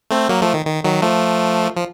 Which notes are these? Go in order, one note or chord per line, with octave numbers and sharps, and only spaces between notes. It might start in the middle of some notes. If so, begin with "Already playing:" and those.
A3 C4
F#3 A#3
F3 A3
D#3
D#3
D#3 F#3
F3 A3
F3